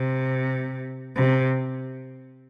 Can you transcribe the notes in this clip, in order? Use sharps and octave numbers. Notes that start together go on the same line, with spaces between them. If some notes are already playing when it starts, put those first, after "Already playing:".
Already playing: C3
C3